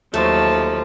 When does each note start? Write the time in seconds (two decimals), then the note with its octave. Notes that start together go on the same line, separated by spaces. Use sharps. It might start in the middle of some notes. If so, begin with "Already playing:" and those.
0.14 D#2 F3 F#3 A3 A5